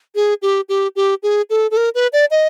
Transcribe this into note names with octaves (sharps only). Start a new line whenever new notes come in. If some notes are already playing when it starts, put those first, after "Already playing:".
G#4
G4
G4
G4
G#4
A4
A4
A#4
B4
D5
D#5